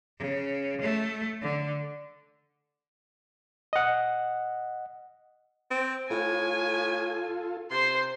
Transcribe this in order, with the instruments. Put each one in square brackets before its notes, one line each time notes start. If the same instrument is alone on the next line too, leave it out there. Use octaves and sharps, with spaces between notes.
[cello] C#3
A3
D3
[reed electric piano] D#5 F#5
[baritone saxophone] C4
[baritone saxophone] A2 [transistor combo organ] F4 A4 [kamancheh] G#5
[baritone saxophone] C3 [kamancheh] C5 C6